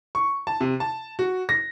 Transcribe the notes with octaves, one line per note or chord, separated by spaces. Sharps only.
C#6
A5
C3
A5
F#4
A#6